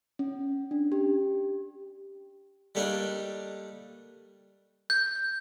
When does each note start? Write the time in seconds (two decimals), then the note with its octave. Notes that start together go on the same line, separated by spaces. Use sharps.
0.19 C#4
0.71 D4
0.92 G4
2.75 G3 A3 A#3 D4 D#4
4.90 G6